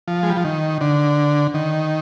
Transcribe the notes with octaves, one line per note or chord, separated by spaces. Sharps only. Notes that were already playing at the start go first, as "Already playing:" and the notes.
F3
G#3
G3
F3
D#3
D3
D#3